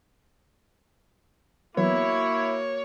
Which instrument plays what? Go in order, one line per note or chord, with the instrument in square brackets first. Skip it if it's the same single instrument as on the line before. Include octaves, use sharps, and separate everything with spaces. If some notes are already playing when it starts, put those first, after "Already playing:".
[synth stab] E3 F#3 B3 [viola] A#3 F#4 [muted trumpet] E4 [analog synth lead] C#5